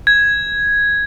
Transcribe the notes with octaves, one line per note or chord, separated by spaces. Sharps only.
G#6